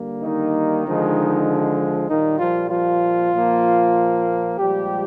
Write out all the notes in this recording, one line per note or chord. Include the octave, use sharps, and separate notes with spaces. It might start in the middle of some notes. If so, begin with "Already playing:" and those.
Already playing: D3 G3 A#3
D#3 D#4
D3 F3 G#3
A#2 D#3 G3 A#3 D#4
F3 F4
F3 F4
A#2 F3 A#3
A#2 F3 G3 G#3 G4